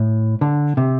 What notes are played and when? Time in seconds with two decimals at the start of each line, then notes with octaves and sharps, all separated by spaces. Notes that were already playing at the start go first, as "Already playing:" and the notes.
Already playing: A2
0.41 D3
0.77 C3